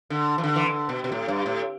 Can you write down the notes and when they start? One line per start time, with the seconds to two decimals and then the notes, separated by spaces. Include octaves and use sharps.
0.10 D3
0.38 E3
0.44 D3
0.56 E3
0.66 D3
0.89 B2
1.04 B2
1.12 A2
1.28 G2
1.46 A2